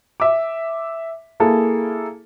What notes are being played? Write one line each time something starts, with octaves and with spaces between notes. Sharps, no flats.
E5 D6
A#3 E4 G#4 A4